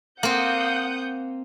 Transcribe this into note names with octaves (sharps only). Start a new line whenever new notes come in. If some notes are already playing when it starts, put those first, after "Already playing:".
A#3 C4 F#5 D#6 G6